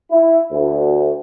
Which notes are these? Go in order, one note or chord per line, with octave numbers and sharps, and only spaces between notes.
E4
D2